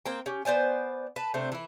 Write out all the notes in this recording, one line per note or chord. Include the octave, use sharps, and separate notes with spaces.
A#3 C4 G5
C#4 G4
B3 C5 D5 G#5
B4 A5
C3 A3 C4 D4
E3 E4